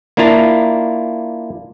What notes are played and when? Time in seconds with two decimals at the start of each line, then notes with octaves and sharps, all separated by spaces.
0.17 A#3 D4 E4 F4 A#5